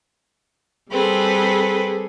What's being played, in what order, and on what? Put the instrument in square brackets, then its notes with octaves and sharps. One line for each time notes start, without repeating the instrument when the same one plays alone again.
[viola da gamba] G3 G#4 A4 [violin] C4 B4